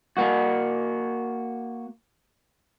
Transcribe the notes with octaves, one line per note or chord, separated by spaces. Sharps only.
A#3 F#4